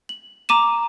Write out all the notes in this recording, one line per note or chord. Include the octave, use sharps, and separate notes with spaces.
F#7
A#5 D6 D#7 E7